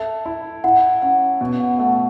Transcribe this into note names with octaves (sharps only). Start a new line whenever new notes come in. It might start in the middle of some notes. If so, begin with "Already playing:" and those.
Already playing: A4 E5
E4
E4 F#5
C#4 F#5
B2
F#5
A3 F#5